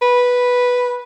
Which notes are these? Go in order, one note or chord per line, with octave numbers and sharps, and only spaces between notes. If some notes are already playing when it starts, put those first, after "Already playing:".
B4